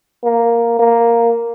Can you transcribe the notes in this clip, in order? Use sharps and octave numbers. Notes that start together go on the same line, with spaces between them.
A#3
A#3